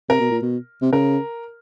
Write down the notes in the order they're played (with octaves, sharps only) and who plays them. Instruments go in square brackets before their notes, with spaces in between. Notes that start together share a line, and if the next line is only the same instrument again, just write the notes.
[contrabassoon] C3 [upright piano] A#4
[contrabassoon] B2
A#2
B2
C3
[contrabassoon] C#3 [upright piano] A#4